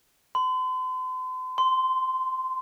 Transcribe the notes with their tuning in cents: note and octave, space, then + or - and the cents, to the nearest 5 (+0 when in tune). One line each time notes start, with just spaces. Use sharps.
C6 -40
C6 -15